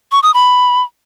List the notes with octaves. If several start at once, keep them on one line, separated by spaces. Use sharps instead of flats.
C#6
D#6
B5